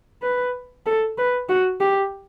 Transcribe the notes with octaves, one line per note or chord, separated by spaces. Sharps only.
B4
A4
B4
F#4
G4